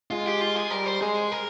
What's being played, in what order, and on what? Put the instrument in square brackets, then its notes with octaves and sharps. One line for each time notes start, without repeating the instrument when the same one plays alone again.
[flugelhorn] G#3 [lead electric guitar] F4
[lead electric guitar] G4
F4
G#4
[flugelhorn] G3 [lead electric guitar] A#4
[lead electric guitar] C5
[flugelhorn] G#3 [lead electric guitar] G#4
[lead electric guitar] A#4